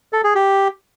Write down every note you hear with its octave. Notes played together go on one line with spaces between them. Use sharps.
A4
G#4
G4